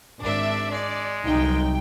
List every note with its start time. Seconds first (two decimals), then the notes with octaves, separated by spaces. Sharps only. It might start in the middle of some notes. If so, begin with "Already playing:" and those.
0.21 G#1 D4 D5 E5
0.71 G#3 D5
1.25 C2 C3 F#3 D#4 G5